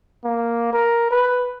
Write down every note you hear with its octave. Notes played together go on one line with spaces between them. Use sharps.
A#3
A#4
B4